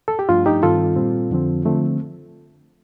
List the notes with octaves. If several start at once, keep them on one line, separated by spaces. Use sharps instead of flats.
A4
G4
G2 F3 A3 D4 F4
D#4 G4
G2 D#3 G3 C4 F4 A4
A#2 G3 C4
F2 D3 F3 C4
D3 F3 A3 C4